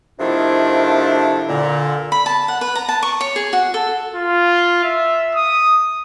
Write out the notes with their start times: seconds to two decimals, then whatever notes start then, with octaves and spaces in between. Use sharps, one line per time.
0.20 C3 D#3 F3 A3 D4 E4
1.49 A#2 D3
2.12 B5
2.26 A5
2.48 F#5
2.61 B4
2.75 A#5
2.89 A5
3.03 C#6
3.21 C#5
3.36 G#4
3.53 F#4
3.74 A4
4.15 F4
4.84 E5
5.35 D#6